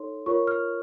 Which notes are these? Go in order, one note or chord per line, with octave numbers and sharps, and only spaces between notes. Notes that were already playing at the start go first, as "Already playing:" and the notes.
Already playing: D#4 A4 C#5 C6
F4 A#4 C#5 C#6
F6